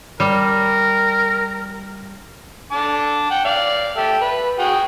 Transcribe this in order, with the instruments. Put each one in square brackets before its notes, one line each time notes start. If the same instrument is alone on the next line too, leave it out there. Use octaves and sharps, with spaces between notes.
[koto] G3 [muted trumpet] A#4
[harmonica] D3 A5 D6
F#5 G5
D5 F5
G4 A4 E5
B4
F#4 G#4 G5